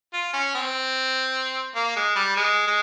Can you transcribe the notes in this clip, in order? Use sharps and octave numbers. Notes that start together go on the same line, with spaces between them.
F4
C#4
C4
A#3
G#3
G3
G#3
G#3